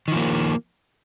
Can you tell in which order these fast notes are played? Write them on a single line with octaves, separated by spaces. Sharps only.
D#3 F3 A#3